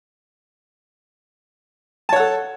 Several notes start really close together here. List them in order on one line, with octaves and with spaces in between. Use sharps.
A5 C#5 F#5 A4